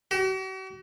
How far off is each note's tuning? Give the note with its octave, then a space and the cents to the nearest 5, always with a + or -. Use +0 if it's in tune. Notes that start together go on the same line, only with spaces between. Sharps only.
F#4 +45